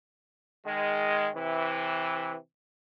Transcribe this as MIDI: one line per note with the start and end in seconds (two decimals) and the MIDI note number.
0.66 1.29 51
0.66 1.29 56
1.35 2.35 48
1.35 2.35 52